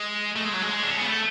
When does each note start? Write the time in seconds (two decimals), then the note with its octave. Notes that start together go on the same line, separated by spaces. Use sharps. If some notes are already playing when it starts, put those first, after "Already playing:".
Already playing: G#3
0.36 A3
0.45 G#3
0.54 F#3
0.62 G#3
0.83 D4
0.91 C#4
0.98 B3
1.07 A3